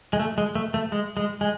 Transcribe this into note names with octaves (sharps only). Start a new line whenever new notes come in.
G#3
A3
G#3
A3
A3
G#3
G#3
G#3